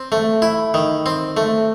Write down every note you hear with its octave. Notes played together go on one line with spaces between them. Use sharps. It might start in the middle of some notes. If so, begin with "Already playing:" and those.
Already playing: C4
A3
E4
D#3
C4
A3